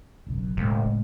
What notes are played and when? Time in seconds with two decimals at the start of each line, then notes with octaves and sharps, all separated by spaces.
0.27 F#1 B1 F#2
0.57 E1 A2 C#3 G#3